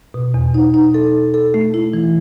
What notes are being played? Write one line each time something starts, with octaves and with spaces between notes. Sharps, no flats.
B2
E2
D#4
D#4
A4
A4
A4
A3
E4
E3